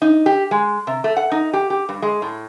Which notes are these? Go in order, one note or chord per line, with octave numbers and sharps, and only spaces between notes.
D#4
G4
G#3
C3
A3
F#5
D#4
G4
G4
G2
G#3
A2